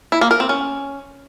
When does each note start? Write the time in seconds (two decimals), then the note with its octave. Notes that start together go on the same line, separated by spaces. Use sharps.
0.12 E4
0.21 A#3
0.31 A#4
0.40 C4
0.49 C#4